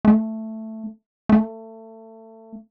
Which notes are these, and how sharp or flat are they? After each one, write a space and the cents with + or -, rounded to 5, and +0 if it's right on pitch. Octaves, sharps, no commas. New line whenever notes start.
A3 +5
A3 +25